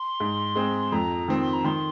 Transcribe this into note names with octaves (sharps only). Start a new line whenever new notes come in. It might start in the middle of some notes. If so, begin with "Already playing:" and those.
Already playing: C6
G#2
G#3 C4
F2 A#5
D#3 C4
C6
A#5
D#3 C6